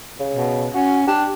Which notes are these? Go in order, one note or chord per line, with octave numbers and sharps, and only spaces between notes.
C#3
B2
C#4 F#4
D4 G4